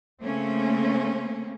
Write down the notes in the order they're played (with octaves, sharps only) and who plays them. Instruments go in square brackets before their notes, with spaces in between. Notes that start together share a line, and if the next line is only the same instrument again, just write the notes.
[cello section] C#3 A3 A#3 C4 C#4